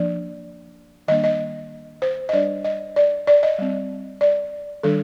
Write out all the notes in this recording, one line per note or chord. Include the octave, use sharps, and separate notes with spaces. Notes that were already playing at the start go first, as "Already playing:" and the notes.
Already playing: F3 A#3 D4 D5
D#3 G3 A#3 D4 D#5
D#5
C5
D#5
G3 D4 D5
D#5
D5
D5
D#5
G3 C4
D5
D#3 G3 D4 A4